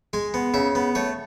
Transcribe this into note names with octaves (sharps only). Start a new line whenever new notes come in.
G#3 G#5
B3
C#3 E5
B3
A3 C#5